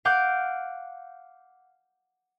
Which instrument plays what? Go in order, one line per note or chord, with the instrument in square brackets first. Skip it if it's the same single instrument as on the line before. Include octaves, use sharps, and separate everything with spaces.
[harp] F5 F#5 D6 G6